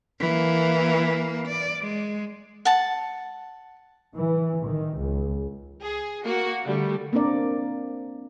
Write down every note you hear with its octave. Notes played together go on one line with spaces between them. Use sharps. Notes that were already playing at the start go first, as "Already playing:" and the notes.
E3 A#3
D5
G#3
F#5 A5
E3
D#3
C#2
G#4
A#3 F#4
D3 G3 A3
A#3 C4 D4 A#4 D5